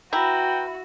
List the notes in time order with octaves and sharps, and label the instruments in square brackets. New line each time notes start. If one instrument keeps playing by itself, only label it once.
[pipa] E4 [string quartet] F#4 [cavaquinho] B4 A#5 [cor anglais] G5